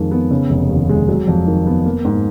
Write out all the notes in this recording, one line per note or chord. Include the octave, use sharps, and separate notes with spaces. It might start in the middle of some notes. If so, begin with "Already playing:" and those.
Already playing: F2 D#3 G#3
B3
C#3
F1
D#2
G#3
F#3
F2
D#3
B3
A#3
G#2